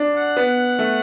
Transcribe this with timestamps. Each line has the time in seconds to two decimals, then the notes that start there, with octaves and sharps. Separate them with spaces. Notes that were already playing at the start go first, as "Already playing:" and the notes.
Already playing: D4
0.14 F#5
0.36 B3
0.79 A3